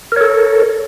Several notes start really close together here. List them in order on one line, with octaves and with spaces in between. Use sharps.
A#4 C#5 A4